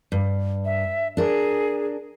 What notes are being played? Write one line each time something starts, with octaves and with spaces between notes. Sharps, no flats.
G2
E5
D4 G#4 A#4